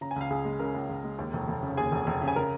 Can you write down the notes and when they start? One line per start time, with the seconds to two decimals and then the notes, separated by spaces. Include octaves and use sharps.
0.01 C#3 A#5
0.11 G#5
0.16 C#2 F5
0.30 C#2 G#4 G#5
0.45 G#3
0.59 C#3 A#4 A#5
0.74 C#2
0.89 C#2
1.04 G#3
1.18 D#2
1.33 F1
1.48 F1
1.63 C#3
1.77 D#2 G#4 G#5
1.92 F1
2.07 F1
2.22 C#3
2.28 G#5
2.36 C#3 A#4 A#5